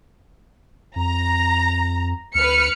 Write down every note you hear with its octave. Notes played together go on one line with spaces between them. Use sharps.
F2 A#5
D2 B4 F6 C#7